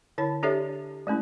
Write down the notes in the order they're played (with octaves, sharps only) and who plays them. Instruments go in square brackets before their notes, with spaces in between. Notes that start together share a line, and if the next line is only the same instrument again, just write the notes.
[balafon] D3 E4 C#5 A5
D4 G4 A4 C#5 D5 E5
G#3 A3 C#4 E4